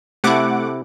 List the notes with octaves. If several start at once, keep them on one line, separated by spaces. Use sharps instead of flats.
C3 A3 E4 F#5 D6